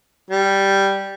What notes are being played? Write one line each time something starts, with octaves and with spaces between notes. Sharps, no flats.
G3